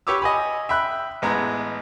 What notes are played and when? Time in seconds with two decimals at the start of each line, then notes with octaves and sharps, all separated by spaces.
0.07 G4 B4 C#5 D6 E6
0.22 D#5 G#5 B5
0.69 E5 G5 B5 F#6
1.22 A1 G#3 B3 A#5